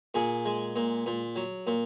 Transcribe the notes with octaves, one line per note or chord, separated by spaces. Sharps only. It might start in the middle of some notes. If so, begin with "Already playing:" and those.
A#2 G#4
G#3
A#2
A#2
F#3
A#2